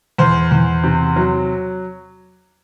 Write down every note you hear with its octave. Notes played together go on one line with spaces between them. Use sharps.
E2 C5
E2
C3
F#3